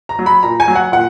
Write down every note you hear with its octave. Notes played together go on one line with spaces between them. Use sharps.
A#5
F#3
B5
A#2 A#5
G#5
F#3
F#5
A#2 F#5